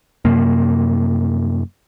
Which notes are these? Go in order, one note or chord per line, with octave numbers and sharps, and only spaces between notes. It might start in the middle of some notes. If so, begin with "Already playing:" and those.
F#2 C3 A#3